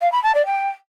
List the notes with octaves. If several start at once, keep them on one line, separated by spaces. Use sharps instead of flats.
F5
B5
A5
D5
G5